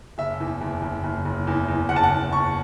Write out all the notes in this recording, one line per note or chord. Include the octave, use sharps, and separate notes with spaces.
F#1 E5
E2
F#1
F#1
F#1
F#1
E2
E2
F#1 F#5
A5
F#5
F#1
F#1 C#6